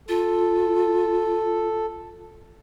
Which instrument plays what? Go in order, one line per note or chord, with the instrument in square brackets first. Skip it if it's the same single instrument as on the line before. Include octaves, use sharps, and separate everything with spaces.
[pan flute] F4 [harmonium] A4